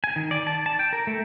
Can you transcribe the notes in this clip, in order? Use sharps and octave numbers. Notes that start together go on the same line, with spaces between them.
G#5
D#3
D5
A5
A5
G5
A#4
A3